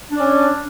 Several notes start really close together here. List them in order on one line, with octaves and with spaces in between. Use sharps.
D4 D5 C#4